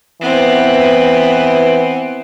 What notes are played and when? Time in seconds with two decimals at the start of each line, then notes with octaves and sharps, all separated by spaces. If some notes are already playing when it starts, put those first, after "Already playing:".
0.21 E3 B3 C4